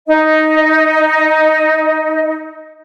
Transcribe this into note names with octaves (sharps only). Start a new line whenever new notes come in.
D#4 D#5